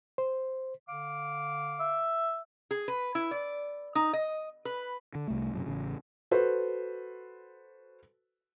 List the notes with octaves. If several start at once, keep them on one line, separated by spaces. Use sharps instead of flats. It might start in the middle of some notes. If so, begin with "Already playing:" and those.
C5
D3 F5 D6
E5
G#4
B4
E4
D5
D#4
D#5
B4
D3
C2 A3
F#2 A2 C3
A1 C#3
F#4 A4 B4 C5